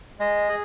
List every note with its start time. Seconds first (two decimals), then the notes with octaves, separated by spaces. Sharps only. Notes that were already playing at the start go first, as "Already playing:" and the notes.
0.20 G#3 D#5
0.49 G#4